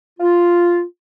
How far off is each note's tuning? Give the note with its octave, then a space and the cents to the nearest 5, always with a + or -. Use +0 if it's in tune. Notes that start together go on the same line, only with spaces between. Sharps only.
F4 -5